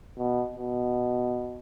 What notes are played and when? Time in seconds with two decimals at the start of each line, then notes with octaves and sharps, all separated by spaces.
0.18 B2
0.56 B2